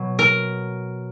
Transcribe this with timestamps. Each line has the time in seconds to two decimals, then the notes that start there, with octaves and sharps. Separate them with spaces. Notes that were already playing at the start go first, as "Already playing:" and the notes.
Already playing: B2 F#3
0.19 A#4